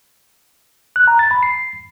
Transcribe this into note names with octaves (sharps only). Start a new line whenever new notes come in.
F#6
A#5
A6
B5
C7